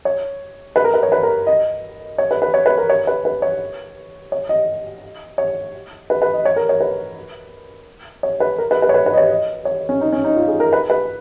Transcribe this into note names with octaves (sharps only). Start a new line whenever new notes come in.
C#5
B4
A#4
B4
C#5
B4
A#4
D#5
C#5
B4
B4
C#5
B4
A#4
C#5
B4
B4
C#5
C#5
D#5
C#5
B4
B4
D#5
C#5
A#4
C#5
B4
C#5
B4
A#4
B4
B4
C#5
B4
B4
D#5
C#5
D#5
C#5
C#4
D#4
C#4
D#4
F4
G#4
A#4
B4
B4